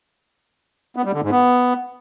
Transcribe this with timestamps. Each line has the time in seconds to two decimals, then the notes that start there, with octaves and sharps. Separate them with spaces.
0.96 B3
1.05 G3
1.14 D3
1.22 G#2
1.31 B3